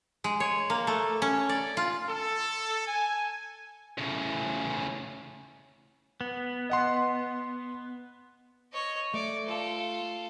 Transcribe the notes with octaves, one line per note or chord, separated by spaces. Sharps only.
G#3
C#5
A#3
A3
C#4
D5
F4
A4
G#5
A2 C#3
B3
D#5 F#5 C6
C#5 D#5
A3 D5
F4 A4